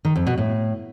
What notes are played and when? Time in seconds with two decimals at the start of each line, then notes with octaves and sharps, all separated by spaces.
0.05 D#3
0.16 F2
0.27 B2
0.38 A2